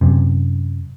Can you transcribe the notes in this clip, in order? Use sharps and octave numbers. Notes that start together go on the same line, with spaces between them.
F#2 C3